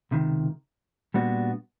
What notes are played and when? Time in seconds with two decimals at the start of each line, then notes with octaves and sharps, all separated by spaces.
0.11 C#2 C3 D#3
1.14 A#2 G3 B3 D4 F#4